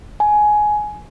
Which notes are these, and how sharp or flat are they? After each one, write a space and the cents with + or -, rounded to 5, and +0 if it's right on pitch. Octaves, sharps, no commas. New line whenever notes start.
G#5 +15